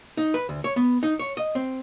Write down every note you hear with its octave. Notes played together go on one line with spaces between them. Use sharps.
D#4
B4
D2
C#5
B3
D#4
C#5
D#5
C4